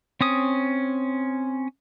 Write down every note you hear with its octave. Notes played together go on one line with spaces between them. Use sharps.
C4 C#4 D#6